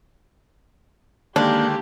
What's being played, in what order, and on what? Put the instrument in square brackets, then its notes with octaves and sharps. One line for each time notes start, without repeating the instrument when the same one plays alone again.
[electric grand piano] D3 D#3 G#3 [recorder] A#3 [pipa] D4 [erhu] G4